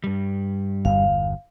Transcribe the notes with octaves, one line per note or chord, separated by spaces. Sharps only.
G2 G3
G1 E2 F5